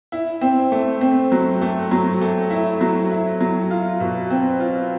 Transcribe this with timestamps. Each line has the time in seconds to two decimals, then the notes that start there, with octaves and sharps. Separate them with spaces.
0.12 E4
0.41 C4
0.72 A3
1.01 C4
1.32 F#3
1.62 A3
1.91 F#3
2.21 A3
2.51 E4
2.81 F#3
3.11 E4
3.40 F#3
3.71 F4
4.00 B2
4.30 C4
4.60 F4